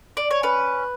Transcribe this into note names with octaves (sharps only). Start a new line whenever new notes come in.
D5
C#5
C#4 B4